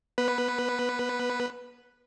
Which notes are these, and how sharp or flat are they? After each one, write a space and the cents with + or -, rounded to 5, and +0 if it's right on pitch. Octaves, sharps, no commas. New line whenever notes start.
B3 -25 B4 +0